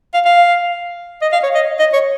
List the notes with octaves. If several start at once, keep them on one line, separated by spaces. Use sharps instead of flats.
F5
F5
D#5
F5
C#5
D#5
D#5
C#5